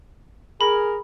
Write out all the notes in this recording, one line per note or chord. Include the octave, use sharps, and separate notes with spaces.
G#4 A#4 B5